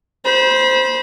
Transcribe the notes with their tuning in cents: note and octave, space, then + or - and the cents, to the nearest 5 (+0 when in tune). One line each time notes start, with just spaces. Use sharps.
C5 -5 B5 -35